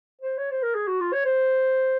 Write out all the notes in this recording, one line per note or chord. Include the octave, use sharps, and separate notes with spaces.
C5
C#5
C5
A#4
G#4
F#4
F4
C#5
C5